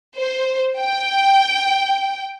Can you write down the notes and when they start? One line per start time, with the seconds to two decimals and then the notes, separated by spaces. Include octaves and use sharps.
0.17 C5
0.78 G5